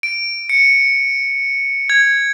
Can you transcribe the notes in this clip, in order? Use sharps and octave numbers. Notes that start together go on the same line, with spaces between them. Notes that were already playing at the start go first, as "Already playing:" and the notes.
D7
C#7
G#6